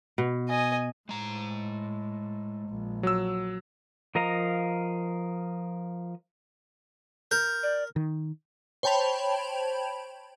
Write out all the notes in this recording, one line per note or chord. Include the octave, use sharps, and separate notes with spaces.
B2
D#5 G#5
A2 G#3 A#5
A#1
F#3 E6
F3 A#4 D#5 F5 A#5
A#4 G6
D5
D#3
C5 C#5 G5 A5 B5 F7